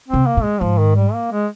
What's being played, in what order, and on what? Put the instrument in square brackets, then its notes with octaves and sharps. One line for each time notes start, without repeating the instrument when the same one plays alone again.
[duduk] C4
[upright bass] C3
[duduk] A#3
[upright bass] A#2
[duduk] G#3
[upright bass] G#2 [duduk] F3
[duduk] D#3
G3
A#3
G#3